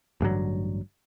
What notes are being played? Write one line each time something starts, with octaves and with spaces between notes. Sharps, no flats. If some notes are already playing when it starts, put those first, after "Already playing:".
A1 G2 D3 F#3